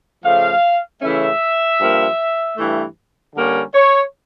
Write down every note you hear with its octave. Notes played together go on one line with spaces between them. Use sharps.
C#3 F3 A3 F5
C#3 E3 A3 C#4 E5
G2 F3 A#3
G2 E3 A3
D3 G3 A#3 C#4
C#5